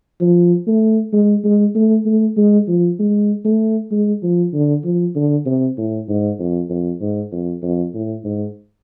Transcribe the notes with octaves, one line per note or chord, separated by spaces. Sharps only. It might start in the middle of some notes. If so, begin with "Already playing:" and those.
F3
A3
G#3
G#3
A3
A3
G#3
F3
G#3
A3
G#3
F3
D3
F3
D3
C3
A2
G#2
F2
F2
G#2
F2
F2
A2
G#2